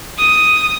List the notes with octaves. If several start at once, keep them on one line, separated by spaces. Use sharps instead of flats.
D#6